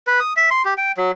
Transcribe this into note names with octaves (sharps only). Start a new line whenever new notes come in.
B4
D#6
E5
C6
G4
G5
F#3